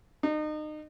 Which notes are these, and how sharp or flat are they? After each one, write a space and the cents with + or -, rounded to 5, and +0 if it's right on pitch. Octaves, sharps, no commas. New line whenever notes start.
D#4 -30